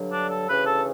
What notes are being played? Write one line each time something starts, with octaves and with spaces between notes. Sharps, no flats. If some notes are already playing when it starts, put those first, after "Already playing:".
Already playing: G2 D3 F#3
D4
A4
D2 C#3 E3 B4
A4